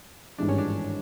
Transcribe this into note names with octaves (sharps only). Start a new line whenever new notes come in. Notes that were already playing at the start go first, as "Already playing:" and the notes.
G#1 G2 E3 G#3 D4
C#4
D4